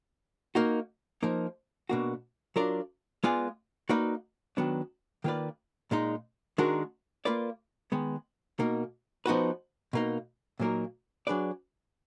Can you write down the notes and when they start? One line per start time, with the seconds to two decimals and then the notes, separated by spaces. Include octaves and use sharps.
0.55 A#3 D#4 F#4
1.23 F3 A#3 D#4
1.89 B2 A#3 D4 F#4
2.56 F#3 D4 F4 A#4 D5
3.24 G#3 B3 F4 G#4 D5
3.89 A#3 D#4 F#4 B4 D5
4.57 D#3 F#3 B3 D4
5.24 D#3 A#3 F4 B4 D5
5.91 A#2 G#3 D#4
6.58 D#3 G#3 D4 F#4 A#4
7.25 A#3 F4 B4 D5
7.92 D#3 G#3 B3
8.59 B2 A#3 D#4
9.26 F3 B3 D#4 F#4 B4
9.93 B2 A#3 D#4
10.60 A#2 F#3 A#3 D#4 A#4
11.27 F#3 D4 G#4 B4 D5